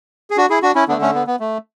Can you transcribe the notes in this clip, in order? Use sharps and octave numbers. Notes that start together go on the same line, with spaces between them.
G#4
D4 F#4
E4 G#4
D4 F#4
C#4 E4
D3 A3 B3 D4
A3 C#4
B3
B3
A3